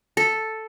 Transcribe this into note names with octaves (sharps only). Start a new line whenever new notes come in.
A4